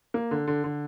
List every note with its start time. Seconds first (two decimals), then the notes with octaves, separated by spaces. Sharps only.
0.14 A#3
0.31 D3
0.47 D3
0.64 D3